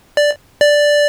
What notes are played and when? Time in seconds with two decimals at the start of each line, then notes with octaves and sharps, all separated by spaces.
0.17 D5
0.61 D5